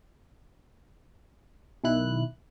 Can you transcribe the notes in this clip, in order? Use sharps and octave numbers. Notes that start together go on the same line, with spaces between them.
B1 D#3 E4 F#6